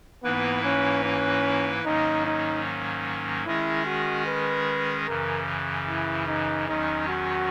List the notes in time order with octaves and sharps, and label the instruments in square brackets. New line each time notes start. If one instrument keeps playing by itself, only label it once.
[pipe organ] G#2 E3 A#3 E4 B4 [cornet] B3
[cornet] C#4
C#4
[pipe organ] G#2 D#3 F#3 A#3 C#4 [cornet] D#4
[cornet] D#4
[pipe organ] D#3 G#3 C#4 G#4 [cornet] E4
[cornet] F#4
B4
[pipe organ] F#2 C#3 E3 [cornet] A#4
[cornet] E4
D#4
[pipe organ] E2 D#3 F#3 C#4 [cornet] D#4
[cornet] F#4